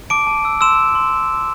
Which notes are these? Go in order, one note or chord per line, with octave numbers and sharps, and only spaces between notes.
A5 D6 D7
A5
E6
C6 E6 E7
A5
C6